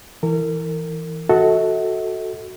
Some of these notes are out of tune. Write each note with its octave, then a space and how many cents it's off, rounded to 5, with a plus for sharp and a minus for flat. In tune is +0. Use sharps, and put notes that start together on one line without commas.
E3 -5 A#4 -35
F#4 +0 A4 +0 D#5 +45